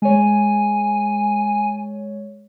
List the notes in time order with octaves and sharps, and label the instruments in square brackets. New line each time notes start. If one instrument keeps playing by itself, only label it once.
[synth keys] G#3 C#5 [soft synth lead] G#5